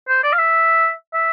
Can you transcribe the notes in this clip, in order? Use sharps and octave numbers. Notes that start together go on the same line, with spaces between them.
C5
D5
F5
E5
E5